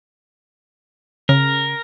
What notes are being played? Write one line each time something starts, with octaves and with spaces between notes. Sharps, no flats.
C#3 A#4